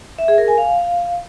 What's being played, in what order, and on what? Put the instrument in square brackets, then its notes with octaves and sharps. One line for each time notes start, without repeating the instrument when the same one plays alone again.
[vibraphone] E5
G#4
A#4
G#5
F5